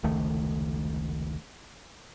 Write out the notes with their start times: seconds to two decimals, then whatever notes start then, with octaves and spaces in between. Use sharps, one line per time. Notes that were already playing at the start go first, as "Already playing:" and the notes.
0.03 F1 C#2 D#3 A3